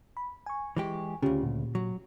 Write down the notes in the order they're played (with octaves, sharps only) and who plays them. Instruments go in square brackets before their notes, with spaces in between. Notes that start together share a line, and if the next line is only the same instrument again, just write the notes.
[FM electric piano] B5
G#5 C#6
[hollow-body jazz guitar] E3 G#3 G4
[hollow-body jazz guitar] D2 C#3 [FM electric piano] C#4 F4 G4
[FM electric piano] A#2
[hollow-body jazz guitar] F#3